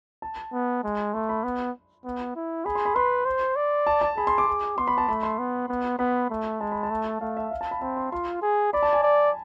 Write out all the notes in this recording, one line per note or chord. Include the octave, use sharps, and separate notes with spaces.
A5
B3
G#3
A3 C6
B5
B3
B3
E4
G#4 B5
C6
B5
B4 C6
C5
D5
A5
A5
G#4 B5
C6
D6
G#4
B3 C6
B5
A5
A3 B5
C6
B3
B3
B3 B5
A3
G#3 A5
B5
A5
A3
A3 F5
E5
F5
A5
B5
C4 B5
C6
F4 C6
G#4
D5 B5
A5
G#5
D5